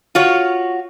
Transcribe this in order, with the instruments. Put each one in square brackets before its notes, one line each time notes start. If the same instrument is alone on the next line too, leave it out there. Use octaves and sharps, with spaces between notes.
[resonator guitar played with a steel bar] F4 F#4 C#5